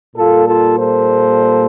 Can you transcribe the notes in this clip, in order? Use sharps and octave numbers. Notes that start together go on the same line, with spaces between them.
A#2 G3 A#3 F4 A4
F4 A4
A4 C5